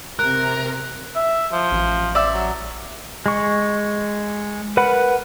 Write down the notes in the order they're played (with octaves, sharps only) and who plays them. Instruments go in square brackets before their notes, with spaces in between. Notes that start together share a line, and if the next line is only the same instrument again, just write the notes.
[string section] C3 [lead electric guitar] A#4 [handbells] F#6
[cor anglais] E5
F3
[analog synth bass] A1
[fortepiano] D5 E5
[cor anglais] F#3
[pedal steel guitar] G#3 C#6
A#4 B4 F#5 B5